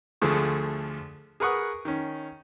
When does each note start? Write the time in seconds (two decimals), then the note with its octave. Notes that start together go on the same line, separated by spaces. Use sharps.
0.22 D2 D3 F3 A3 G#4 C#6
1.40 G#4 A#4 B4 F#5 C#6 D#6
1.85 D#3 C#4